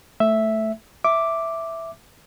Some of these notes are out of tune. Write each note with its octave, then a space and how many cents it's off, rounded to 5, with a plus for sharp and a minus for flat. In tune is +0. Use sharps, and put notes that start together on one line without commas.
A3 +0 E5 +0
E5 +0 D6 +0